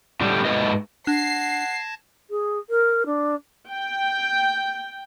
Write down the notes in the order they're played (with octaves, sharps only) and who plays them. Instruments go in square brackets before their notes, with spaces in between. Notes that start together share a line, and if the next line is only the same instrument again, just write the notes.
[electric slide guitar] A2 D3 G3
G#2 A3 B4 D#5
[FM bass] D4 [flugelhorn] F#5 [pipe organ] A5 G#6 A#6 [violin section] C7
[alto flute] G#4
A#4
D4
[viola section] G5